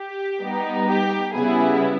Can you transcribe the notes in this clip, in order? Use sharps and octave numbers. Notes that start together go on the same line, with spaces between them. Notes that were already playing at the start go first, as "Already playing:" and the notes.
Already playing: G4
G3 B3 D#4
G4
C#3 G3 B3 E4 G#4